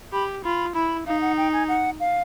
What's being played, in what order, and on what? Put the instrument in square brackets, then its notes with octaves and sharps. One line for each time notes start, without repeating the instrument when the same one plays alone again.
[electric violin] G4 [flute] B5
[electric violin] F4 [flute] B5
[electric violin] E4 [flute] B5
[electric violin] D#4 [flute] F5
[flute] F#5
G5
G#5
F#5
F5